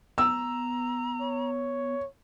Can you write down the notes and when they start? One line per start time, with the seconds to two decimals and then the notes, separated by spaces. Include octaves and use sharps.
0.18 B3 A#5 E6
1.21 C#5